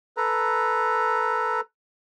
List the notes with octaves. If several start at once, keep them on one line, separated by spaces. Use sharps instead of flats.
A4 B4 A#5